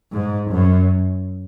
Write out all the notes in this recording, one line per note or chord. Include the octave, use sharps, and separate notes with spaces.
G#2
F#2